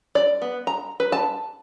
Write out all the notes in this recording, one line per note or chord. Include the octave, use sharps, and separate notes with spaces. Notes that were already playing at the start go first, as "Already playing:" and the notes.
D5
B3
A#5
B4
A5